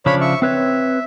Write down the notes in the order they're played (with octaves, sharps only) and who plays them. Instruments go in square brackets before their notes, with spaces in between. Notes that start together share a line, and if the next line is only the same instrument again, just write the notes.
[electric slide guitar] C#3 F3 D4 [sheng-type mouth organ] C#5 B5
[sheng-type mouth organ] E5 C#6
[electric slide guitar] C4 B4 C#5 [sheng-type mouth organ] E5